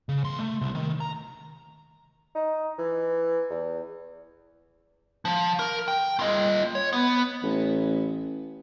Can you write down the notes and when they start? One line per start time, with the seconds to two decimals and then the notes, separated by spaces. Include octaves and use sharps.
0.09 C#3
0.24 D#2 C6
0.39 A3
0.61 C2
0.75 D#3
1.00 A#5
2.35 D#4
2.79 E3
3.50 E2
5.25 F3
5.59 A#4
5.88 G5
6.20 F4 D#5
6.75 C#5
6.93 B3
7.43 A1